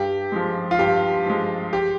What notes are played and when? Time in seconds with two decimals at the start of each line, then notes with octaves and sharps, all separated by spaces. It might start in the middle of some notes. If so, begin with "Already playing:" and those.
Already playing: G2 G4
0.32 F3 G#3
0.71 F4
0.79 G2 G4
1.26 F3 G#3
1.73 G4